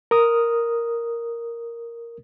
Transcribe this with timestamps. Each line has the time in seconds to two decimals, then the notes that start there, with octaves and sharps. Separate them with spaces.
0.11 A#4 D#6